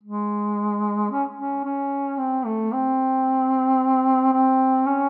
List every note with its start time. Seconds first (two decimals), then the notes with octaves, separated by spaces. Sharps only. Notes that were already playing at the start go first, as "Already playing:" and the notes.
0.04 G#3
1.11 C#4
1.36 C#4
1.64 C#4
2.18 C4
2.45 A3
2.72 C4
4.33 C4
4.86 C#4